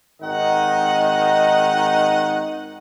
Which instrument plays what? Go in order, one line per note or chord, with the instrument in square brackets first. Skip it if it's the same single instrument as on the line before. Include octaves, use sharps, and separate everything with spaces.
[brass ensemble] G#1 D#3 D#4 D#5 F#5